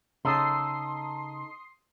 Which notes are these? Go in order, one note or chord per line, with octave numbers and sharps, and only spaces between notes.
C#3 D#4 A4 C6 D#6 C7